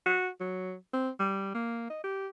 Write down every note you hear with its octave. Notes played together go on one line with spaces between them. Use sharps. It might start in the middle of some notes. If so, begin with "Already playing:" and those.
F#4
F#3
C4
G3
A#3
D#5
G4